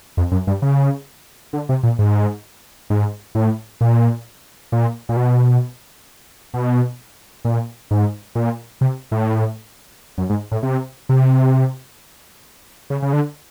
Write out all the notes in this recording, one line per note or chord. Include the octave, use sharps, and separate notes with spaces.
F2
F#2
G2
C#3
D3
C3
A#2
G#2
G#2
A2
A#2
A#2
A#2
B2
B2
A#2
G#2
A#2
C3
A2
F#2
G#2
A2
C3
C3
C#3
C#3
D3